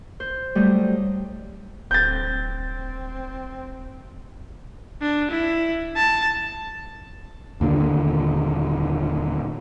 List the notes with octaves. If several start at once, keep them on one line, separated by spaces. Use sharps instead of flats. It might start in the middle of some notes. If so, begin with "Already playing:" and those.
C5
F#3 G3 A3 G4 D#5
D1 C4 G6 A6
D4
E4
A5
D#2 A#2 D3